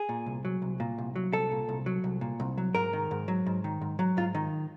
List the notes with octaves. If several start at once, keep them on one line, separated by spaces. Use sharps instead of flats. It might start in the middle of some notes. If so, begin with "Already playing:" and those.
Already playing: G#4
A#2
C2
F#3
C2
A#2
C2
F#3
C2 A4
A#2
C2
F#3
C2
A#2
C2
F#3
G#2 A#4
D#3
G#2
F#3
G#2
D#3
G#2
F#3
G#2 F4
D#3